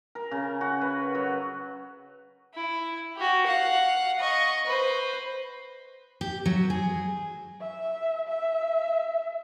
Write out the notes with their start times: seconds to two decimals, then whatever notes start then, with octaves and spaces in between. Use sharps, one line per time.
0.15 A#4
0.31 C#3
0.61 F#4
0.81 B4
1.15 F#3
2.54 E4
3.16 F#4 G4
3.46 F5 F#5
4.18 D#5 C#6
4.66 B4 C5
6.21 G4
6.46 F#3
6.70 G#4
7.60 E5
8.28 E5